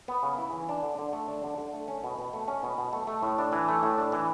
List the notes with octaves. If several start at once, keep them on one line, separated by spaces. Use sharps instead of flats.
B3
C#3
E4
E3
D4
D3
D3
A3
D4
D3
D3
A3
C#4
B2
B2
A3
C#4
B2
B2
A3
A3
A2
D4
E3
A3
A2
D4
E3